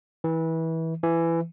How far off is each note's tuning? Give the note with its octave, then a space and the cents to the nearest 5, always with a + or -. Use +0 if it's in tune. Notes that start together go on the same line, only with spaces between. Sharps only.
E3 -25
E3 +15